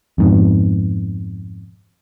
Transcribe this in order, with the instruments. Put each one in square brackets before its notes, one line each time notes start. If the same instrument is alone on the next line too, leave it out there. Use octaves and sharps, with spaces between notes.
[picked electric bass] F2 G#2 B2